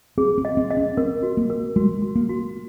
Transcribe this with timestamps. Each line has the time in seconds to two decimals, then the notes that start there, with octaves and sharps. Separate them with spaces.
0.18 C4 G#4
0.38 C4
0.45 D#5
0.57 C4
0.71 D#5
0.77 C#4
0.97 C4 A#4
1.23 F#4
1.37 A#3
1.50 A#4
1.76 G#3 F#4
2.02 F#4
2.15 A#3
2.29 F#4